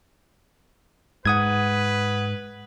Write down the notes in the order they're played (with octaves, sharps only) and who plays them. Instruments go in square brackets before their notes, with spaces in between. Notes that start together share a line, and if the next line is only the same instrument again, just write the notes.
[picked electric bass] G#2 [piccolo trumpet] B4 [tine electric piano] F#5 D#6 G#6